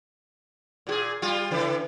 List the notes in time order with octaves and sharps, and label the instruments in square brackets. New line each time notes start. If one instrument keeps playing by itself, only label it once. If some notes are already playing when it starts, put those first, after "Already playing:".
[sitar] A#2 F#4 G#4
G3 F4
C#3 E3